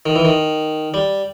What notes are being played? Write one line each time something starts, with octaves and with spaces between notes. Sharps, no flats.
D#3
E3
D#3
G3